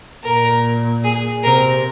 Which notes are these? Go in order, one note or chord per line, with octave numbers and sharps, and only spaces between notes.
A#2 A#4
G#4
C3 A#4